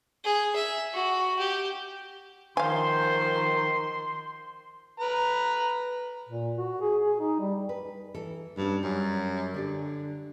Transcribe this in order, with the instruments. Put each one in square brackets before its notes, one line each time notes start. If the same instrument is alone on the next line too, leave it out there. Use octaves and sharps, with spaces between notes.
[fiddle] G#4
E5
F#4
G4
[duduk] D#3 [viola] F3 C5 [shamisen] F5 G#5 [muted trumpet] C6
[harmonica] B4 A#5
[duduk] A#2
F#4
G#4
G#4
D#4
G3
[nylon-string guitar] B4
E3 A4
[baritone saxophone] G2 [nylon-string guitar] C#4 F#4 G4
[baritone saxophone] F#2 [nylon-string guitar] G3
[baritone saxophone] D3 [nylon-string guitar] D4 G4 D5